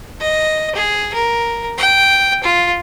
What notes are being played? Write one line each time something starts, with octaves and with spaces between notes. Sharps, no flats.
D#5
G#4
A#4
G5
F4